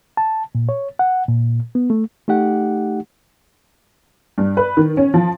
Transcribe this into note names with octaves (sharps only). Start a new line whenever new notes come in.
A5
A#2
C#5
F#5
A#2
B3
A3
A3 D#4 G4 F#5
G2
B4
D#3
C#4
F3